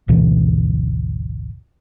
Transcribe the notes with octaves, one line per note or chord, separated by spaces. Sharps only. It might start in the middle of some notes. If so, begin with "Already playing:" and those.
G#1 D2 B2 E3